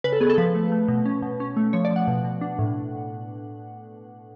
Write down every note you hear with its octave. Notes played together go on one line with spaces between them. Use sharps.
C#3 B4
A4
B3 G#4
A4
F3 B4
A3
A3
B2
C#4
B2
C#4
A3
F3 C#5
D5
F3
F#5
B2
B2
D4
A2